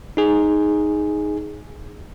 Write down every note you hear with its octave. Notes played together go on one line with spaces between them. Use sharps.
D#4 G#4